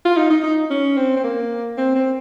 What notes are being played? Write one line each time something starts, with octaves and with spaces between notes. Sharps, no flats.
F4
D#4
D#4
D#4
C#4
C4
C4
A#3
C4
C4